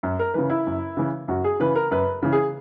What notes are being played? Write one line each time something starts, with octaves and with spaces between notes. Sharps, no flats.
F#2
A#4
C#3 E3 B4
E4
F#2
C#3 E3
F#2 F#4
G#4
C#3 E3 B4
A#4
F#2 B4
C#3 E3
G#4